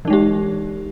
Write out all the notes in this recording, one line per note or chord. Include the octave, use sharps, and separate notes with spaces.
E3 G#3 D#4 G4